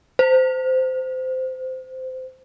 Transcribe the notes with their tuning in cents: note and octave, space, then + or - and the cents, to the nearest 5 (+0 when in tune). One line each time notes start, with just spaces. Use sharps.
C5 -20